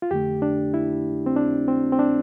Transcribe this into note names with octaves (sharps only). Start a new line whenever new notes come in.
F4
F2 D3 A3 G4
D4
E4
C4
D4
C4
C4
D4